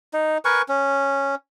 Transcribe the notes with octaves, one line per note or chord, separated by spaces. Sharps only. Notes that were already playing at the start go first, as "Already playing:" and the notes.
D#4
A#4 B4 G#5 C#6
C#4